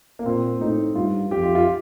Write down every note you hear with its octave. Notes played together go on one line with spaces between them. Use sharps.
A#3
A#2 C4
A2 D#4
G2 F4
F2 G4
F4
F4